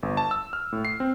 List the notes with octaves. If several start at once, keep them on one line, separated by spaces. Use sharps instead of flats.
G1
A5
E6
F6
A2
C7
C4